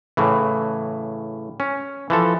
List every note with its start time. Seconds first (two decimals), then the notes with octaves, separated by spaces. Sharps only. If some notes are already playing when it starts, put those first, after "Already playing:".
0.17 A2 C#3 E3
1.60 C#4
2.10 E3 F3 A4